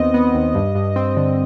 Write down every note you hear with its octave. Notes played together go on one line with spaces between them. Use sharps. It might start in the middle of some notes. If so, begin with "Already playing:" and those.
Already playing: D#2 B3 C4 D#5
B3
D#2
G2
G2
C4
D3